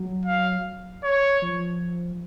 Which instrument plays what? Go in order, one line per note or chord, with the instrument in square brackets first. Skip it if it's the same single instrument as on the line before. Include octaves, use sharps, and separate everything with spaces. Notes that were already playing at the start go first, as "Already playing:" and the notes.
Already playing: [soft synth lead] F#3
[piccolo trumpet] F5
C#5
[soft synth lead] F3